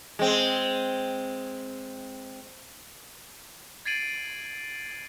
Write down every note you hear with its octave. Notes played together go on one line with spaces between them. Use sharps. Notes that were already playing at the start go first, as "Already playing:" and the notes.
G#3 C4
G#6 A6 C7 D7 D#7 F#7